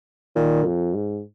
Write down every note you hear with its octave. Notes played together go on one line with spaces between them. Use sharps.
A#2 D#3
F2
G#2